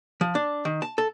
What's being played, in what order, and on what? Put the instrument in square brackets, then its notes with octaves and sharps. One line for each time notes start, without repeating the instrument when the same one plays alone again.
[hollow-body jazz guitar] F3
D4
D#3
A5
A4